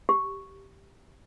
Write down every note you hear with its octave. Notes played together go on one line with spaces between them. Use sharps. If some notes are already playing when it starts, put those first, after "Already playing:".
G4